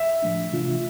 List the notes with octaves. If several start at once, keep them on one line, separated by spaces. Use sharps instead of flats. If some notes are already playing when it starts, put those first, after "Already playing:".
Already playing: E5
A2 F3 A3 D4
C3 E3 A3 D4 F4